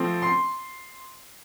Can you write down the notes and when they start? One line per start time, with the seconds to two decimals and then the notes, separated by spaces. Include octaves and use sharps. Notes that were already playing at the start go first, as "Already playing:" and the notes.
Already playing: F3 A3 C4
0.22 C6